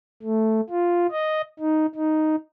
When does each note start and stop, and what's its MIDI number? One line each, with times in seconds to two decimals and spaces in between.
0.23 0.61 57
0.70 1.07 65
1.11 1.41 75
1.60 1.86 63
1.95 2.36 63